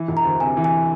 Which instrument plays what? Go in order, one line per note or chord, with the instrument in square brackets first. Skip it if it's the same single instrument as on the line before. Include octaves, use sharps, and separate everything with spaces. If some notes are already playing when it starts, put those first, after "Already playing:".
Already playing: [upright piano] E3
E1
[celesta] A#5
[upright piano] D2
[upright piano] C3 [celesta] G#5
[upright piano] E3
[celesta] G#5